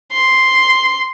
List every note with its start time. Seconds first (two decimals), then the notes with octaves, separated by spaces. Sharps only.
0.12 C6